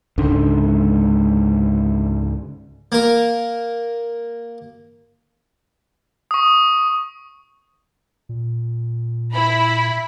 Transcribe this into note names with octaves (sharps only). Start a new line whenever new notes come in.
C#2 G#2 D3
A#3 A#4
C#6 D#6
A#2
E4 B5